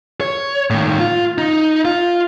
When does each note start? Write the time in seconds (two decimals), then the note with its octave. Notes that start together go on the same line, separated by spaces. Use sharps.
0.21 C#5
0.70 A2 D#3
0.99 F4
1.38 D#4
1.85 F4